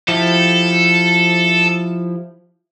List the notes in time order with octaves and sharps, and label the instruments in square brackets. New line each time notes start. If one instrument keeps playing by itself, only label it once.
[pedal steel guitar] F3 E4 G4 [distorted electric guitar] A4